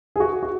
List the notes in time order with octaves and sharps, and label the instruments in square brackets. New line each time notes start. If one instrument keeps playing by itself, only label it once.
[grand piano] G#4
F#4
F#4